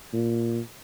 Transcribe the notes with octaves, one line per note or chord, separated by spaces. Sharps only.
A#2